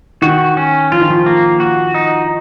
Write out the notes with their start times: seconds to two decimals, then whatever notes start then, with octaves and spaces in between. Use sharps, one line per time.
0.22 D#3 F#4
0.57 C#4
0.92 F3 F4
1.01 D#3
1.10 F3
1.26 A#3
1.60 F#4
1.94 D#4